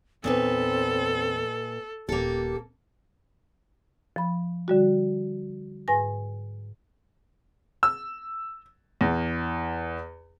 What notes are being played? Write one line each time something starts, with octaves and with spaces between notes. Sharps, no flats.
E2 A#2 C4 D#4 A4 B4
D#1 A#3 G4 A4
F3 B5
D3 G3 F#4
G#2 B4 G#5 A#6
E6
E2